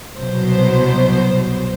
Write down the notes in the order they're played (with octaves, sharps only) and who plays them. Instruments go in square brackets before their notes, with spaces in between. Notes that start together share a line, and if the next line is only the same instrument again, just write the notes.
[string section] C2 B2 F#3 C5